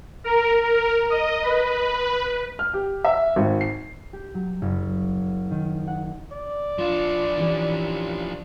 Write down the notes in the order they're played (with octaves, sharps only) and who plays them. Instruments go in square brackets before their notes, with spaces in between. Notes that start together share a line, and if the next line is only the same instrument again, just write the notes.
[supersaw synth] A#4
A#4
D#5
B4
[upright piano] F6
G4
E5
G#1
C7
[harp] G4
F#3
F#1
D#3
F#5
[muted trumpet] D5
[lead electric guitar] F3 D4 [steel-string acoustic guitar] F4
[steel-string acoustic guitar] E3 C#4 G4